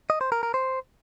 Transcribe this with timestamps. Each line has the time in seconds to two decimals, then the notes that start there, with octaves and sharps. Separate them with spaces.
0.10 D#5
0.21 C5
0.32 A#4
0.43 A#4
0.54 C5